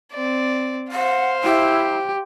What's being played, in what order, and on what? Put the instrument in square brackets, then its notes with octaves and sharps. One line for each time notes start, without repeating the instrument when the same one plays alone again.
[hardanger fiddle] C4 D5
[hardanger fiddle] C5 F5 [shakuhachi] F#5
[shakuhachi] E4 [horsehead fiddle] G4